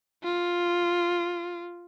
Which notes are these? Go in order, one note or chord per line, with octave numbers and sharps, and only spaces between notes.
F4